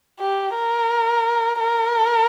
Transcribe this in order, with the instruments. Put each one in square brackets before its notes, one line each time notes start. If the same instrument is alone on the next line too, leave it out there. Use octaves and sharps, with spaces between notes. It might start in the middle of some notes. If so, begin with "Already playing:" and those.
[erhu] G4
A#4
A#4